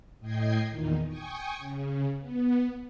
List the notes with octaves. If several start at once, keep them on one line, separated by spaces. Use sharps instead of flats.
A2 D#5 G5 G#6 C7
E2 A#2 D#3 D#4
G5 G#5 C#6 D#6
C#3
B3